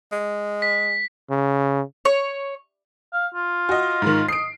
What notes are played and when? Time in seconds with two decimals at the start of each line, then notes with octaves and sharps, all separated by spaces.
0.12 G#3
0.62 B6
1.30 C#3
2.05 C#5
3.13 F5
3.35 F4
3.69 F#4 D#5
4.02 G#2 D#3
4.28 D#5 C7 D7